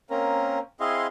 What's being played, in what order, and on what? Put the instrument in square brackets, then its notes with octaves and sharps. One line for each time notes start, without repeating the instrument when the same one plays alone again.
[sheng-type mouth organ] A#3 C4 C#4 A#4
C4 E4 G#4 D#5 F5 C6